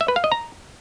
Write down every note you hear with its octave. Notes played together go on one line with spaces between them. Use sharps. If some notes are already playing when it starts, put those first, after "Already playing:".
E5
B4
F5
D#5
A#5